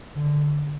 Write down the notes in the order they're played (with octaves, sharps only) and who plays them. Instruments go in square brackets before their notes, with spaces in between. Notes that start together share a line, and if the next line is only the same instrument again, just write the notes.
[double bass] D3